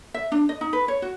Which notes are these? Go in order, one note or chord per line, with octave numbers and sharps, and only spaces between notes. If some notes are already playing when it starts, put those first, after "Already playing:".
E5
D4
D#5
D#4
B4
C#5
F#4